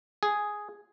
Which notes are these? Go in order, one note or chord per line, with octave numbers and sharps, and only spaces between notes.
G#4